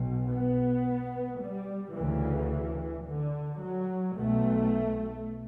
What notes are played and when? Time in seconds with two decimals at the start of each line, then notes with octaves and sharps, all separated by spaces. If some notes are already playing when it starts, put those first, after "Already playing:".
Already playing: B1 B2
0.29 B3
1.41 G3
1.95 D2 C#3 E3
3.07 D3
3.62 F#3
4.17 B1 B2 A3